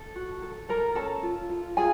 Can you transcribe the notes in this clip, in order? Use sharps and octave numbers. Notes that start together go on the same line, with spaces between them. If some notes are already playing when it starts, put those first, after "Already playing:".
Already playing: A4
F#4
A4
A4 A#4 A#5
C#4 A4 A5
F4
F4
F4 G#4 G#5